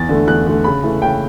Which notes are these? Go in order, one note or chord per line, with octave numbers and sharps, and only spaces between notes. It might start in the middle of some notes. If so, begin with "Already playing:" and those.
Already playing: E2 A6
D3 A3
E2 F#6
D3 A3
C#3 B5
E3 A3
C#3 G5